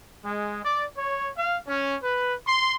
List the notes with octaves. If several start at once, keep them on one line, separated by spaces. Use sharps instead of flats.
G#3
D5
C#5
F5
C#4
B4
C6